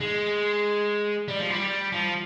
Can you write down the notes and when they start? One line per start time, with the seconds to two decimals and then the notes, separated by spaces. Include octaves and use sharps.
0.01 G#3
1.28 G3
1.39 F3
1.50 G3
1.92 F3